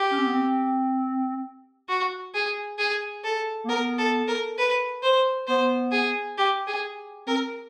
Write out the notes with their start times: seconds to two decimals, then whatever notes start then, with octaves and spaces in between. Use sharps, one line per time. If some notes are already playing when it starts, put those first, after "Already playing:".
Already playing: G4
0.11 C#4
0.18 C4
0.27 B3
0.34 C4
1.89 F#4
2.34 G#4
2.79 G#4
3.24 A4
3.64 A#3
3.68 B3 A#4
3.98 A4
4.28 A#4
4.58 B4
5.03 C5
5.47 B3 C5
5.92 G#4
6.38 G4
6.67 G#4
7.26 C4 A#4